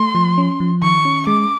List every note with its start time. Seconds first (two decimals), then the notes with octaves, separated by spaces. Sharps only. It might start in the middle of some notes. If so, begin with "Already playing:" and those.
Already playing: A3 C6
0.15 F3
0.38 C#4
0.60 F3
0.82 D#3 C#6
1.05 C#4
1.27 G#3 D6